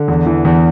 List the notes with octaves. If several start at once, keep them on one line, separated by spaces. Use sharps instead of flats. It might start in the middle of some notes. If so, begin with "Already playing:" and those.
Already playing: D3
E2
E3
E2